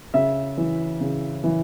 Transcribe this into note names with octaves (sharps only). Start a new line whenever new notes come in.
C#3 E5
E3
C#3
E3